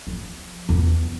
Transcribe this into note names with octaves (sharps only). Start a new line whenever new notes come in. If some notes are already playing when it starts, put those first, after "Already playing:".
F3
E2